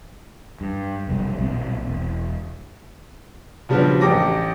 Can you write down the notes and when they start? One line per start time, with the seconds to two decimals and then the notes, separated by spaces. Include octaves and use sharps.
0.61 G2
1.07 F1 B1 C3 G3
1.38 B1 A#2 E3 C4
1.85 E1
3.69 C#3 F3 G3 B3 D4 F#4
4.01 A1 G4 D6 A#6